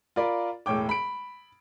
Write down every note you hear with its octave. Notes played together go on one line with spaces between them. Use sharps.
F4 A#4 D5 B5
E1 A2 C#5 G5 D6
B5 D7